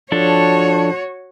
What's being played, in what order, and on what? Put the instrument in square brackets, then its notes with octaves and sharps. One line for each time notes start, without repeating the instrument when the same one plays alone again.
[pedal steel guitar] F3 D4 A4 [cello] F#4 C#5